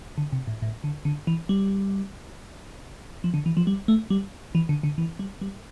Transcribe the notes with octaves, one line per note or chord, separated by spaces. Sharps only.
D3
C3
A2
A2
D3
D3
E3
G3
F3
D3
E3
F3
G3
A3
G3
E3
D3
D3
E3
G3
G3